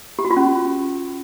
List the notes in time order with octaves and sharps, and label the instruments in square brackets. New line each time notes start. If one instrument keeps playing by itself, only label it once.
[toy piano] G4
F#4
F4
C#4